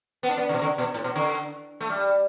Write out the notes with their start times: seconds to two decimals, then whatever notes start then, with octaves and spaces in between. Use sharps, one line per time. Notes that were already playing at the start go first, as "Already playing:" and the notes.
0.23 B3
0.30 D4
0.38 B3
0.49 D3
0.54 B2
0.62 D3
0.78 B2
0.94 A2
1.04 B2
1.16 D3
1.80 A3
1.90 G3